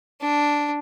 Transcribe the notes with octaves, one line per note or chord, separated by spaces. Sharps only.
D4